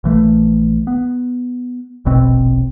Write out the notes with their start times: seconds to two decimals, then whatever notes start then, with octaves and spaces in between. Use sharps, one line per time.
0.04 A#1 E3 A3
0.87 B3
2.05 E1 A#1 B2 C4